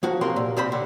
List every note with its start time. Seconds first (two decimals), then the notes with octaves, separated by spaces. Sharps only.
0.03 F3 A#3 F#4
0.21 C#2 C3 A#3 A#4 C6
0.36 A#2
0.57 C2 C3 C4 C5 B5
0.72 D3